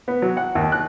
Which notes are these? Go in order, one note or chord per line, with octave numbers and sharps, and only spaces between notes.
B3
F#3
F#5
D#2
F#6